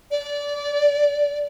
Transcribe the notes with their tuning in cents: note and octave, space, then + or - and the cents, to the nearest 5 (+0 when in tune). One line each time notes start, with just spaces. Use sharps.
D5 -20